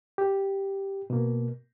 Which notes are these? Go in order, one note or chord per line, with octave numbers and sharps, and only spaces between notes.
G4
B2 A#3